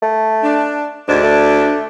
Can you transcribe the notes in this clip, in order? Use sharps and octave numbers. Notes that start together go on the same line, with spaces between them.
A3
D4
D2 G#2 D4
A3